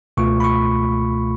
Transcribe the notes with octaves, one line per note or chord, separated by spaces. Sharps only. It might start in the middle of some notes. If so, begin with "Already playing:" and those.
C#2 B2 A3 F4 C#6
B5
C#6